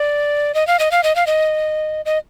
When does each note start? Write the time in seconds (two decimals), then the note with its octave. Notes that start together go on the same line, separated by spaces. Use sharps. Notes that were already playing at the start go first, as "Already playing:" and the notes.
Already playing: D5
0.54 D#5
0.67 F5
0.79 D#5
0.91 F5
1.03 D#5
1.16 F5
1.27 D#5
2.05 D#5